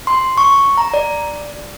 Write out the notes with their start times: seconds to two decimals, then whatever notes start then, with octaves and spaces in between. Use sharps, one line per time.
0.07 C6
0.38 C#6
0.77 A#5
0.94 D5